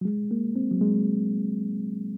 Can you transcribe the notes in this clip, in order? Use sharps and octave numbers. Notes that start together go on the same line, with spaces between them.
F#3
G#3
A#3
C4
F#3
G#3